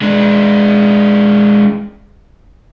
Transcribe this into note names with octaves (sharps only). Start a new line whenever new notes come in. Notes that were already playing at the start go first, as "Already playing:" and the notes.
G#3 D4